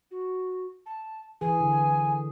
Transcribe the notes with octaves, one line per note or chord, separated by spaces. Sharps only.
F#4
A5
E3 G#4 G#5
D3